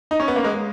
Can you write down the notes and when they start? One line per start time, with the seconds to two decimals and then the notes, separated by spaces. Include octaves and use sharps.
0.11 D#4
0.20 C#4
0.28 B3
0.36 A#3
0.44 G#3